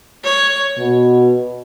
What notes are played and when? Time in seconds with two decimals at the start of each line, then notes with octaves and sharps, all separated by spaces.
0.24 C#5
0.79 B2